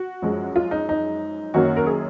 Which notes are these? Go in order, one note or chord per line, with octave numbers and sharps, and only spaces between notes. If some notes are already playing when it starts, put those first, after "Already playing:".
Already playing: F#4
F#2 F3 G#3
F4
D#4
D#4
F#2 D#3 A#3 C#4 F#4
A#4
G#4